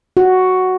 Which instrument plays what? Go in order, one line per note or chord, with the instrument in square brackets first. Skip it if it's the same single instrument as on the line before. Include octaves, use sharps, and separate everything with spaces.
[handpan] F#4